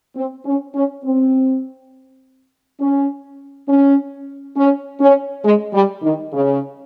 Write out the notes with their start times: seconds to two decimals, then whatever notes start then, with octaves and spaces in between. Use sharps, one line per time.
0.15 C4
0.46 C#4
0.74 C#4
1.04 C4
2.80 C#4
3.68 C#4
4.56 C#4
5.00 C#4
5.44 G#3
5.73 G3
6.03 D#3
6.32 C#3